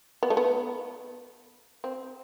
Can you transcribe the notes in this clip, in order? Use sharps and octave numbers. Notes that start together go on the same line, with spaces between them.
B3
A3
B3
C4